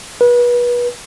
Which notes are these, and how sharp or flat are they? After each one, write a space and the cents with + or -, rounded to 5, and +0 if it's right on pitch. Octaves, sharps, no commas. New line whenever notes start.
B4 -30